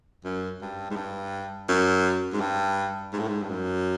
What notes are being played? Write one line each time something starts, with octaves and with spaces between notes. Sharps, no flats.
F#2
G2
G#2
G2
F#2
G#2
G2
G#2
A2
G#2
G2
F#2